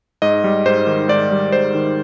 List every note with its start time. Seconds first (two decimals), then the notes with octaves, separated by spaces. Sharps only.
0.22 G#2 D#5
0.44 G3
0.66 G#2 C5
0.87 D#3
1.09 G#2 D5
1.31 G3
1.52 G#2 C5
1.75 D#3